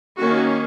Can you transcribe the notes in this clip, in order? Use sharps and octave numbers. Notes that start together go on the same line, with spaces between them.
D#3 A#3 C#4 F#4